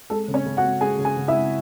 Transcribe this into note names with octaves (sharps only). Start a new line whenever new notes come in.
G#3 A4
C#3
C#4 C#5
C#3
F#4 F#5
G#3
G#3 G#4 G#5
C#3
G#4 G#5
C#3
E4 E5
G#3